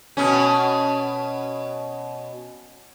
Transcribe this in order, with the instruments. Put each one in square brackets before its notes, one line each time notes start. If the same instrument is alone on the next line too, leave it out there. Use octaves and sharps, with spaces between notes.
[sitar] B2 C#4